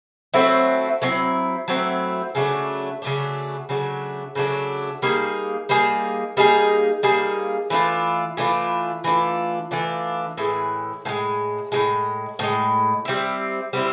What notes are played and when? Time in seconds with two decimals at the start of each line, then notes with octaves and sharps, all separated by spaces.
0.34 F#3 A3 C4 E4
1.02 F#3 A3 C4 E4
1.68 F#3 A3 C4 E4
2.35 C#3 F#3 A3 D4
3.02 C#3 F#3 A3 D4
3.69 C#3 F#3 A3 D4
4.35 C#3 F#3 A3 D4
5.02 G3 A#3 D#4 G#4
5.69 G3 A#3 D#4 G#4
6.37 G3 A#3 D#4 G#4
7.03 G3 A#3 D#4 G#4
7.70 E3 A3 D4 F4
8.37 E3 A3 D4 F4
9.04 E3 A3 D4 F4
9.71 E3 A3 D4 F4
10.37 A2 E3 G#3
11.05 A2 E3 G#3
11.72 A2 E3 G#3
12.39 A2 E3 G#3
13.05 G3 C4 E4
13.73 G3 C4 E4